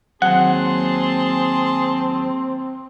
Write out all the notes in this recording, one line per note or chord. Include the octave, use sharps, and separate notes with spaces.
D#2 F#3 C4 G#4 F#5 A5 C6